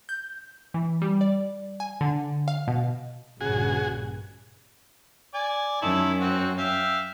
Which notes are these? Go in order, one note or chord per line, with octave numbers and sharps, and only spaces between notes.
G6
E3
G3
D5
G#5
D3
F5
B2
A#1 G2 C#3 F#4 G#4 G#5
D5 G#5
F#2 D#3 C#4 E4 A5
C4 F#4
E5 F5 G5